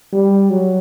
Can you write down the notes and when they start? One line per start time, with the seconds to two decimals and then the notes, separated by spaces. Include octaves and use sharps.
0.13 G3
0.51 F#3